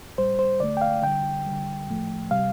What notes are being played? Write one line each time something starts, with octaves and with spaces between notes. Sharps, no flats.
A2 G3 C5
C5
D3 A3 D5
G5
F5
D3 G3 G5
D3 G3
A2 F3 A3
C3 G3 F5